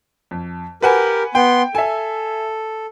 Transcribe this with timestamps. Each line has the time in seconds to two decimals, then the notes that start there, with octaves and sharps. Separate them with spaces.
0.31 F2
0.82 G4 A#4 B4 F#5 G#5
1.35 B3 G5 C6
1.75 A4 E5 G#5